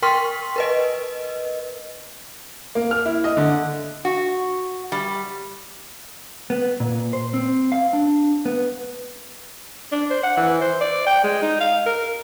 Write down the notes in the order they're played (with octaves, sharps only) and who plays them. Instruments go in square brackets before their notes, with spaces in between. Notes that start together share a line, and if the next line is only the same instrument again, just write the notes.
[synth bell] A#4 G5 C6 C#6 F6 B6
A#4 B4 D#5
[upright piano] A#3
F6
E4
D#5
D3
[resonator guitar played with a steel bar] F#4
G3
[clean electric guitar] B3
A#2
C5
C4
F5
D4
B3
[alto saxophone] D4
C5
F#5
E3
C5
D5
G5
G#3
D#4
F5
A#4